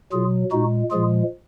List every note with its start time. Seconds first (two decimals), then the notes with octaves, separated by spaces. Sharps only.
0.12 B2 F#3 F4 G#4
0.52 A#2 G#3 D#4 F#4
0.91 A#2 F3 G#3 F4 G#4